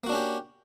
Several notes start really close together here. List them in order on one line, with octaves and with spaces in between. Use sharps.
A#3 F#4 D4 C#4 G4